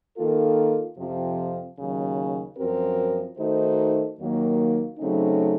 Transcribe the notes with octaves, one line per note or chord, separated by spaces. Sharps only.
D#3 A#3 F4 A4
F2 C3 F3 C4
D#2 C#3 F#3
F#2 F3 C4 F#4 A#4
D#3 A3 D#4 F#4 C5
D#2 D#3 F#3 A#3
C#3 F#3 A3 C4 D#4